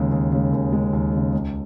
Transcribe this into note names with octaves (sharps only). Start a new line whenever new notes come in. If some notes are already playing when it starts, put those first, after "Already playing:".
Already playing: D#2 C#3 G#3
D#2
C#3 G#3
D#2
C#3 G#3
D#2
C#3 G#3
C#2